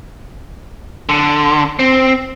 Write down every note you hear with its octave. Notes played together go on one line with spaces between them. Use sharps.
D3
C4